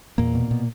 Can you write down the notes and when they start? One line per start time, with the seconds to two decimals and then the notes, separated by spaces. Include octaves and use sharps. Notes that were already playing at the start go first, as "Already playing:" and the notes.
0.18 E2 A#2 A#3
0.35 B2
0.51 B2